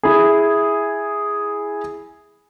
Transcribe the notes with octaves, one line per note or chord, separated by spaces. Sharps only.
E4 G#4